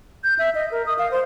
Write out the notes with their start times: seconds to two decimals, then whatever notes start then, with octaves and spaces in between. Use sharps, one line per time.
0.24 G6
0.39 E5
0.55 D#5
0.71 A#4
0.86 D#6
0.99 F5
1.11 C5